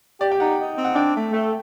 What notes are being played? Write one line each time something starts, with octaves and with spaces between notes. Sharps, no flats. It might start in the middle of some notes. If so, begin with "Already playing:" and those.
G4 D5
G5
D#4 F#5
D#4
C4
F#5
D4 G5
A3
A3